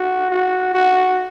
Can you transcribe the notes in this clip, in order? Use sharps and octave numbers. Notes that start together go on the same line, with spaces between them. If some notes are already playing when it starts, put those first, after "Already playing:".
Already playing: F#4
F#4
F#4